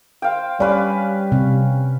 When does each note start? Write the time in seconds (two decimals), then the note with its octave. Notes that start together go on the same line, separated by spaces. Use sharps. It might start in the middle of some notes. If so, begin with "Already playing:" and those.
0.22 C5 F5 G5
0.60 G3 C#4 B4 D5 F5
1.32 C3